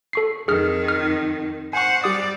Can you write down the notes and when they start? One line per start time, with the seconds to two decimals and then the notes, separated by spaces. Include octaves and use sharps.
0.13 A4 C#6 C7
0.48 F2 D#3 G#4 F6
0.88 F6
1.73 C5 F#5 G#5 C#6
2.04 G3 G4 D5 D#6